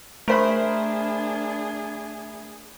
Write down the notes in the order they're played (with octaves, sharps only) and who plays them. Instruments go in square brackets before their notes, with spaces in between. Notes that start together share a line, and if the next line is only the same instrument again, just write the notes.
[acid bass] A3 [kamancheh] D4 G#4 [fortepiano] A#4 C5 B5